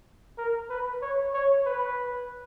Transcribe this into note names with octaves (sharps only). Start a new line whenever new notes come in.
A#4
B4
C#5
C#5
B4